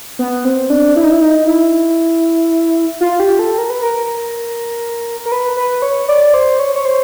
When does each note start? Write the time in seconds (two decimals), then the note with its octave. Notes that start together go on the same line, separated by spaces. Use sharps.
0.19 B3
0.45 C4
0.70 D4
0.96 E4
1.04 D#4
1.11 E4
1.21 D#4
1.47 E4
3.01 F4
3.20 G4
3.39 A4
3.58 A#4
3.70 B4
3.82 A#4
5.26 A#4
5.32 B4
5.57 B4
5.82 C#5
6.08 D5
6.34 C5
6.59 C#5
6.76 C#5
6.85 C5